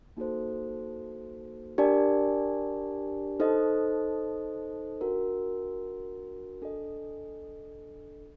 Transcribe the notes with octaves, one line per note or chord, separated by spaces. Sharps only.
A#3 D#4 F#4 A4 C5
D4 G4 A#4 D5 A5
D#4 A4 C5 D#5
D4 F#4 A#4
D4 A4 D#5